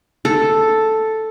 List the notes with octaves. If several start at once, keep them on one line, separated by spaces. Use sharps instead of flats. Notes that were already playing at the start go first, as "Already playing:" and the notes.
A4